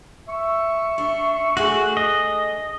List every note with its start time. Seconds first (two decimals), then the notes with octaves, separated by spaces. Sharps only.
0.29 E5 C#6
0.98 D4
1.57 A3 D4 F#4 G#4
1.97 D#5